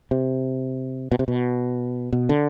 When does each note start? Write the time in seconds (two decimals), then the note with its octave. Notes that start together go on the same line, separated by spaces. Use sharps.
0.11 C3
1.12 B2
1.19 C3
1.28 B2
2.13 B2
2.29 D3